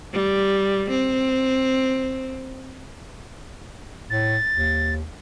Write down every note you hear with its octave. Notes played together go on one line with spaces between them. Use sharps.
G3
C4
A2 A6
D#2